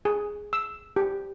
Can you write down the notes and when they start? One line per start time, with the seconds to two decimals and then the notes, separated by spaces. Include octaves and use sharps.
0.05 G#4
0.53 E6
0.96 G4